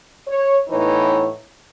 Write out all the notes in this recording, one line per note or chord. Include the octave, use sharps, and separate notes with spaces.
C#5
A2 E3 B3 D#4 C#5